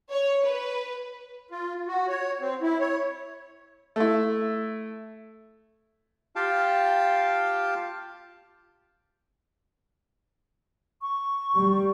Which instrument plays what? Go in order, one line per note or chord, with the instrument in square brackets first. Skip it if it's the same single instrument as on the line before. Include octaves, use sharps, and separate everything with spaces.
[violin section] C#5
B4
[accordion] F4
F#4
C#5
C4
E4
C#5
[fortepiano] A3 E4
[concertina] F4 G4 F5 G5 A5
[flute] C#6
[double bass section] G3